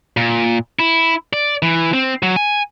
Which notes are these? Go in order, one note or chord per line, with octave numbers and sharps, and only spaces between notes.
A#2
E4
D5
E3
C4
F#3
G#5